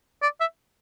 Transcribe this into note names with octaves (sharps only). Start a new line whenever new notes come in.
D5
E5